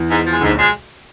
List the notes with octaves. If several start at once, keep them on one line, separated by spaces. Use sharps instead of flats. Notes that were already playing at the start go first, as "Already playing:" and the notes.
Already playing: E2 E3
G#2
F3 G#3
D2 G#2 D3
B1 B2
F3 G#3